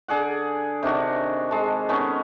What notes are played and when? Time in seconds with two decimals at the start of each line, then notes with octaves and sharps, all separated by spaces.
0.08 D3 G#4 D5 F#5
0.83 C3 D#3 D4 F#4
1.51 G#3 A4
1.89 D#3 B3 C#4 C#6